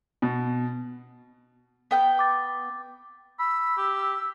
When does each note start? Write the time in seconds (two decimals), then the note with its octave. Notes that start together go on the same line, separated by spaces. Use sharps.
0.22 B2
1.91 B3 G5 G6
2.19 D6 A6
3.39 B5 E6
3.77 G4